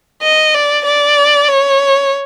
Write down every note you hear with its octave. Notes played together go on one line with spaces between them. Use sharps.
D#5
D5
D5
C#5